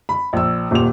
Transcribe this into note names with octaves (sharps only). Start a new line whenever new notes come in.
B5
A#1 E6
D#1 A#2 F7